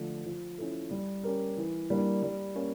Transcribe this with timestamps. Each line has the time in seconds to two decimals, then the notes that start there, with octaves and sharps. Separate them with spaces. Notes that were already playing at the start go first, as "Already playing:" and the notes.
Already playing: D3 F3 A3
0.25 F3
0.58 C#4 E4 A4
0.91 G3
1.24 C#4 G4 A#4
1.57 E3
1.90 G3 A#3 D4
2.23 G3
2.55 A#3 C#4